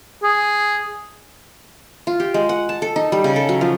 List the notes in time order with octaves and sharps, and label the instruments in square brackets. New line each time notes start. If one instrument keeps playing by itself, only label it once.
[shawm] G#4
[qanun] F4
G4
G#3
F#5
A5
A4
D#4
G3
C#3
A4
F#3
F3